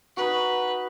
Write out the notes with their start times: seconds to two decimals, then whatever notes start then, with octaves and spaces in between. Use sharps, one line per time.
0.17 D#4 F#4 B4